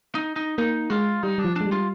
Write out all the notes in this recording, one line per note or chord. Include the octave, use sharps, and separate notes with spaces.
D#4
D#4
A#3 D#4
G#3 F4
G3 D#4
G3 D4
F3
G#3 D4
G3
F4